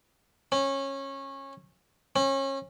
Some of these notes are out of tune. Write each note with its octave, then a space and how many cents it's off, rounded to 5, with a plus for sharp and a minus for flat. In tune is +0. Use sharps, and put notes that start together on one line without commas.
C#4 -20
C#4 -30